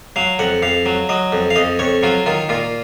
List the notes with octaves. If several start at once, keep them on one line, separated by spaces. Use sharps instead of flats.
F#3 F5
F2 F#5
F2 F5
F#3
F#3 D#5
F2
F5
F2 D#5
F2 C#5
F#3 F4
D#3 F4
A#2 F4